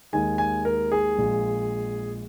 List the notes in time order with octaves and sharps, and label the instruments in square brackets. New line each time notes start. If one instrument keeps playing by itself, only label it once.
[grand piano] D#2 D#3 G#3 G#5
G#5
A#4
G#4
A#1 A#2 G#3